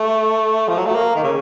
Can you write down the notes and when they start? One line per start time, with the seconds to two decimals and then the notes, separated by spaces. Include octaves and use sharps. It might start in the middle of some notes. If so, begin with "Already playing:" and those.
Already playing: A3
0.68 F3
0.78 F#3
0.86 A3
0.95 A#3
1.16 D#3
1.24 C#3